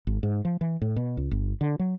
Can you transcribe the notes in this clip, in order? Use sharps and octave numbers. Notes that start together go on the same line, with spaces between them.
G#1
G#2
F3
E3
A2
B2
C#2
G1
D3
F#3